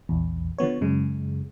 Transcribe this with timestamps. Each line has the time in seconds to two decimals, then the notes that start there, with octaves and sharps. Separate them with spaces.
0.09 A#1 E2
0.58 D3 F3 B3 C#5
0.81 F#2 C#3 G#3